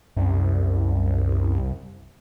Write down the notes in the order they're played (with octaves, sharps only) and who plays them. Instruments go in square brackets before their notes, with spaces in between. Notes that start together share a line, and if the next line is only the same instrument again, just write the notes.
[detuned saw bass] C2 [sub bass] F#2